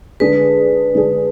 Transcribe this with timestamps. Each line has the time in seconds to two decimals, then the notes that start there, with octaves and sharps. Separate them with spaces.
0.20 D3 G#3 D4 G#4 B4
0.95 D3 G#3 D4 G#4